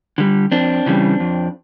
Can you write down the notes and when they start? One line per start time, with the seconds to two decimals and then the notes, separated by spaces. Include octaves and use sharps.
0.18 D3 G3
0.52 F2 C4 D4
0.86 C#3 E3 G3
1.20 F2